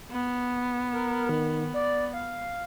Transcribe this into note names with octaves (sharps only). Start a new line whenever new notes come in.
B3
A#4
D#3
D5
F5